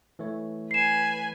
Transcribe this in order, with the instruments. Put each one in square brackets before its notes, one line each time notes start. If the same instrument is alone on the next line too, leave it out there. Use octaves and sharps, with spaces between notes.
[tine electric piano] E3 A3 C#5
[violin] B4 G#5 [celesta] C7 E7